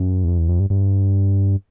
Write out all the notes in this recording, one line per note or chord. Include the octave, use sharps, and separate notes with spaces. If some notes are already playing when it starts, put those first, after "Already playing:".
Already playing: F#2
E2
F2
E2
F2
G2
G2